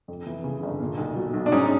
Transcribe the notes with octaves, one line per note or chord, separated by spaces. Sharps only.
F2
E3
C#3
G1
A#2
B1
F#3
B1
D4
G#2 C#4 D#4